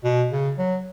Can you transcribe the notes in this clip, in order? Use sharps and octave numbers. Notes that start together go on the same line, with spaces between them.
B2
C#3
F#3